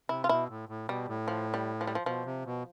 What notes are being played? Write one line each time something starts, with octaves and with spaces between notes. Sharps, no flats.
C3 E4
F4
B2 E4
A2
A2
B2 G3
A2
F3
G3
F3
G3
F3
B2 F3
C3
B2